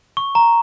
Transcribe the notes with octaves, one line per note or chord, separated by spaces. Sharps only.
C#6
A#5